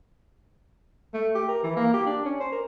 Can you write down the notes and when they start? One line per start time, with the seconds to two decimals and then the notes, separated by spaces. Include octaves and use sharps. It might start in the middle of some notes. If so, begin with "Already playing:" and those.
1.14 A3
1.35 G4
1.48 A#4
1.63 E3
1.76 A#3
1.94 G4
2.07 D4
2.25 C#4
2.40 C5
2.52 A#4